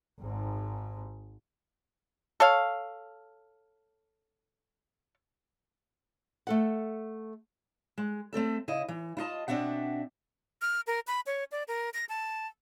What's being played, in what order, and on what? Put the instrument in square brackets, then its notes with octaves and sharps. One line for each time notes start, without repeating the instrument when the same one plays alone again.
[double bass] G#1 G#2
[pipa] A4 C#5 F5
[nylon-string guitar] A3 A4 F#5
[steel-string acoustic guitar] G#3
A3 C4 A4 E5
C#3 E4 D#5
E3
E4 F4 D#5 A5
B2 C4 D4 E5 F#5
[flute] F6
A#4
B5
C#5
D5
A#4
A#6
A5